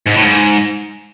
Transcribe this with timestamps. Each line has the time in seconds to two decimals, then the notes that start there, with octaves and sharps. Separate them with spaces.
0.06 G#2
0.15 A2
0.22 G#2